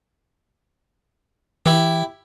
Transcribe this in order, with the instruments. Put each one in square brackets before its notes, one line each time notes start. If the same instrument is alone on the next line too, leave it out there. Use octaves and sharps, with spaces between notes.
[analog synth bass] E3 [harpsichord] E4 G4